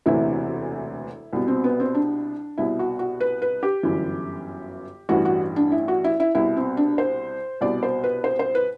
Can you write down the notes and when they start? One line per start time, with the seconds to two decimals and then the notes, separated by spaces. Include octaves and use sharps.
0.06 E1 D2 C3 E3 E4
1.33 C2 B2
1.48 C4
1.64 B3
1.80 C4
1.95 D4
2.58 C2 B2 E4
2.79 F#4
2.99 F#4
3.20 B4
3.42 B4
3.63 G4
3.83 G1 F#2 E3
5.09 A1 G2 E3 F#4
5.25 F#4
5.56 D4
5.72 E4
5.88 F#4
6.04 E4
6.20 E4
6.35 C2 B2 E4
6.57 C4
6.77 D4
6.98 C5
7.61 C2 B2 D5
7.83 C5
8.04 B4
8.24 C5
8.39 C5
8.55 B4